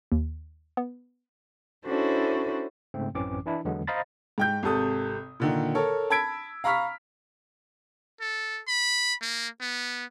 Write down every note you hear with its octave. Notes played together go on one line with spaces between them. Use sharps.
D#2
B3
C#4 D4 E4 F#4 A4 C5
G#2 C#3 A3 C4
A1 F#2 E3 C4 C#4 D6
E3 D4 E4
E2 D3 F#3 G#3 B3
C5 D#5 F5 A#5 B5 A6
G#2 G5 G6
G#1 C3 A4 D#6
A#2 D3 D#3
A4 A#4 C#5
A5 B5 E6 G#6 B6 D7
F5 A#5 B5 C#6 F6 B6
A4
B5
A#3
B3